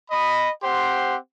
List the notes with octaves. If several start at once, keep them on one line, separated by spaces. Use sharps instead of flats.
D#5 B5
C4 G4 C5 F#5 C6